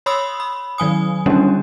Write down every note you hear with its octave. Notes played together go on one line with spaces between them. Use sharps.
C#5 B5 C6 D#6 E6
B5
D#3 F#3 G#5 D#6
D3 D#3 G3 A#3 C#4 D4